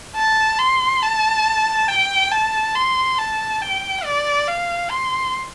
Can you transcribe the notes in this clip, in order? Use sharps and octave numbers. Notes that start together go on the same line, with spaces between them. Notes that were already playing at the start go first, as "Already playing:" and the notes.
A5
C6
A5
G5
A5
C6
A5
G5
D5
F5
C6